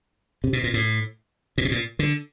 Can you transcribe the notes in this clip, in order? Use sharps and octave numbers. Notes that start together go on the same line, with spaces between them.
C3
B2
A#2
A2
A#2
B2
A#2
D3